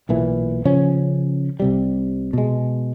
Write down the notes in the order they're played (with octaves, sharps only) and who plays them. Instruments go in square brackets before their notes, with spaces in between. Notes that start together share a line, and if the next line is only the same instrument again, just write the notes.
[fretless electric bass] B1 A#2 E3
C#3 F3 C#4
C2 C3 G3
B2 G#3